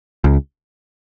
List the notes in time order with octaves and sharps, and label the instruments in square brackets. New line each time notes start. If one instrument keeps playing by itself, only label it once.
[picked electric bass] C#2